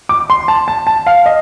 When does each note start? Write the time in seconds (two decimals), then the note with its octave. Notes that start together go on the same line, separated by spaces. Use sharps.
0.09 D6
0.30 C6
0.48 A5
0.68 A5
0.87 A5
1.06 F5
1.26 D#5